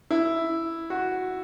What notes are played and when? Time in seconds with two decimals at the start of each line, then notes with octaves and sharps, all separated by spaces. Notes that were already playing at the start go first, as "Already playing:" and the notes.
0.11 E4
0.90 F#4